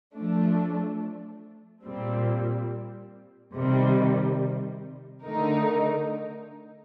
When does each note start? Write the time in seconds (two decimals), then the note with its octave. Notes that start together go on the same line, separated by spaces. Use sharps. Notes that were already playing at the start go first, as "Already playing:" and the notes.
0.15 F3 A3 D4
1.84 A#2 G3 C4
3.55 C3 D#3 G3
5.23 D3 A3 D#4 A#4